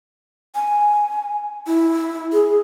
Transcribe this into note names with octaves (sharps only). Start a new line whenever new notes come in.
G#5
E4
G#4